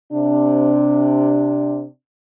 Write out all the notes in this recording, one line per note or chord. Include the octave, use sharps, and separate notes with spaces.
C3 D4